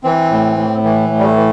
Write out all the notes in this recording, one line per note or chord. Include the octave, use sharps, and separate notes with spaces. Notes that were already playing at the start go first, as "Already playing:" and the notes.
E3 C4
A2
A2
E3
A2
G3
A3
E3